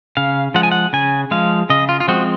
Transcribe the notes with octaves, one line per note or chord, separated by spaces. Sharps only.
C#3 F5
F3 G#3 F#5
G#5
F#5
C#3 G#5
F3 G#3 F5
C#3 D#5
F4
F4
F3 G#3 C4 F#4